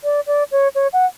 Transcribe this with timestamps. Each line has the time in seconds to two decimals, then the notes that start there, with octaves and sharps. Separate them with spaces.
0.04 D5
0.27 D5
0.52 C#5
0.75 C#5
0.93 F#5